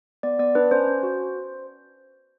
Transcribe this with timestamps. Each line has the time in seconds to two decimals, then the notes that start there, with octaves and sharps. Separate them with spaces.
0.23 B3 D5
0.39 B3 D5
0.55 D4 B4
0.71 C#4 C5
0.87 C#4
1.03 F#4